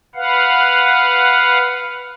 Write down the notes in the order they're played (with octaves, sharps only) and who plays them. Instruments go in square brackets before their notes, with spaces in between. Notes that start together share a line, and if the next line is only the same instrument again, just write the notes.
[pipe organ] B4 F5 F#5